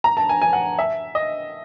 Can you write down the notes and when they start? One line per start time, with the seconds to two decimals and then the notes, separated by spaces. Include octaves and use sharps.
0.04 A#5
0.17 A5
0.29 G#5
0.42 G#5
0.53 F#5
0.79 E5
1.15 D#5